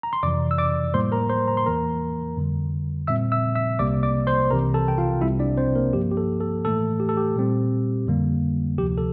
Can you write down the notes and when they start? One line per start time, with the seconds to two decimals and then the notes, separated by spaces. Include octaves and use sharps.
0.03 A#5
0.13 C6
0.23 F2 C3 E3 D5 D6
0.51 E6
0.58 D5 D6
0.94 A2 G3 A#3 C5 C6
1.12 A#4 A#5
1.29 C5 C6
1.48 A#5
1.57 C6
1.66 E2 E3 A#3 A#4 A#5
2.37 F2 D3 G3
3.07 A#2 G3 C4 E5 E6
3.32 E5 E6
3.55 E5 E6
3.79 C2 C3 G3 A#3 D5 D6
4.03 D5 D6
4.27 C5 C6
4.50 C2 C3 E3 A#4 A#5
4.74 A4 A5
4.88 G5
4.98 F4 F5
5.21 C2 C3 G3 C4 E4 E5
5.39 D4 D5
5.57 C4 C5
5.75 A#3 A#4
5.93 G2 F3 A#3 G4
6.11 G4
6.17 A4
6.41 A4
6.65 A2 E3 A3 A4
7.00 G4
7.09 A4
7.17 G4
7.36 A#2 G3 C4
8.07 F2 D3 G3 A#3
8.78 D2 C3 F3 G4
8.98 A4